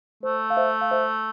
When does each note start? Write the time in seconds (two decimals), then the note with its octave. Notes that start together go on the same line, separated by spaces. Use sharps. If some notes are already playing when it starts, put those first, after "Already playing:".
0.23 A3 C5
0.50 F5
0.57 C5 E5
0.81 F5
0.91 C5 E5